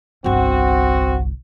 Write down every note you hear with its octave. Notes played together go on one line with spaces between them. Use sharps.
G1 C2 C4 F#4